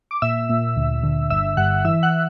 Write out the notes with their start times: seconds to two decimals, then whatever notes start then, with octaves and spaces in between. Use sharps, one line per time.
0.11 D6
0.22 A#2 E5 E6
0.49 A#2
0.76 D2
1.03 D3
1.30 G1 E5 E6
1.57 G2 F#5 F#6
1.85 E3 E5 E6
2.03 F#5 F#6